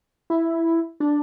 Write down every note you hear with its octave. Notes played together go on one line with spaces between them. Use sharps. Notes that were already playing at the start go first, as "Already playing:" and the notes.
E4
D4